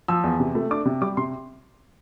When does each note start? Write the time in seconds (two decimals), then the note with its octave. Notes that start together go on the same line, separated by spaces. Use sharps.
0.08 F3 E6
0.24 E2
0.40 C3
0.55 A3
0.71 D4 D6
0.85 C3
1.02 G3 D6
1.17 C3 C6